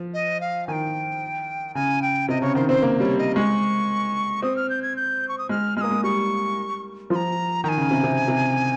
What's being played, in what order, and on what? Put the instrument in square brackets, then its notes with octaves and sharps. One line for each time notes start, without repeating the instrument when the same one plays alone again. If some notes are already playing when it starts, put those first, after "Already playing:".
Already playing: [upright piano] F3
[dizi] D#5
F5
[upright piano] D#3 [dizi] G5 G#5
[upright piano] C#3 [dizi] G#5
[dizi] G5
[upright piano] C3 [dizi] D#5
[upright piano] C#3 [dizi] C#5
[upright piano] D#3 [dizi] C5
[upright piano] C4 [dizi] C5
[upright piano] A#3
[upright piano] G3 [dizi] C#5
[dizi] D#5
[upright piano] G#3 [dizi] C#6
[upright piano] C4 [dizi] D#6
[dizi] F6
G6
G#6
G6
C#6
D#6
[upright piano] G#3 [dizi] F6
[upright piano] G#3 [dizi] F6
[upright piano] A#3 [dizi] D#6
[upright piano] G#3
[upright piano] G3 [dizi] C#6
[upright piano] F3 [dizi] C6
[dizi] A#5
[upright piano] D#3 [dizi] G#5 A#5
[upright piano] C#3
C3
C3
C3